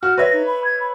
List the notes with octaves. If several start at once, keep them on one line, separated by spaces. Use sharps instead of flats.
F#4 F6
B4 C#5 E5 A#6
D#4
B5
G#6
B5